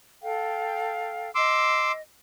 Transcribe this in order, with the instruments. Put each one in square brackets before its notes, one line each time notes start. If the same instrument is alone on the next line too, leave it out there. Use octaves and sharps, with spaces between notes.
[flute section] A4 F5 G5
[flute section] D#5 [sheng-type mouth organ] C6 D6 E6